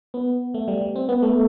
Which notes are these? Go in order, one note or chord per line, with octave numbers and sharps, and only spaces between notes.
B3
A3
G3
G3
C4
B3
A3